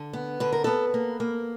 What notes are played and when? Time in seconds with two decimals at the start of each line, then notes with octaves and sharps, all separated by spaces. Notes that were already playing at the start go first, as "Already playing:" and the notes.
Already playing: D3
0.13 B3
0.40 D3 B4
0.53 A#4
0.64 B3 A4 B4
0.94 A#3
1.20 A#3